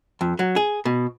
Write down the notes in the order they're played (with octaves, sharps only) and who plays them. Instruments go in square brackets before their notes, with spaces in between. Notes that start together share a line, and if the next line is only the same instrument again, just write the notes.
[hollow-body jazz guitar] F2
F#3
G#4
B2